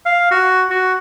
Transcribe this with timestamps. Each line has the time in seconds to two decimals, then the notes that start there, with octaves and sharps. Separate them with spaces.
0.06 F5
0.31 F#4
0.70 F#4